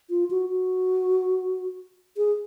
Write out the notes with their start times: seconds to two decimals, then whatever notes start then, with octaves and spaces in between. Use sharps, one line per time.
0.10 F4
0.31 F#4
0.51 F#4
2.17 G#4